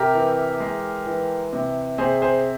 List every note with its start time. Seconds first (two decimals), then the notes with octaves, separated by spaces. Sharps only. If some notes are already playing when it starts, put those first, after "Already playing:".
Already playing: C3 G4 A#4
0.14 E3
0.60 G#3
1.07 E3
1.53 C3
1.98 C3 G#4 C5
2.22 G#4 C5